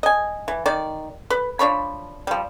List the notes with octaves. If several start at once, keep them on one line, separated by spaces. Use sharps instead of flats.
D#5 G#5
E3
D#3 D5
B4
F3 D4 C#5 B5
F3 G3